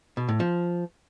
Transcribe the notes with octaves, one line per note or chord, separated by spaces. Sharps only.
B2
A2
F3